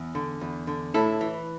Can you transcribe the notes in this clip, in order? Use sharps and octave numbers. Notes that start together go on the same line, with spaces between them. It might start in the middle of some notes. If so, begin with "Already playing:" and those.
Already playing: E2
D3
E2
D3
A2 E4 A4
E3